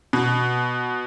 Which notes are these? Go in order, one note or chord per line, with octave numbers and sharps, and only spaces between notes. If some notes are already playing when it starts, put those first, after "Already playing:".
B2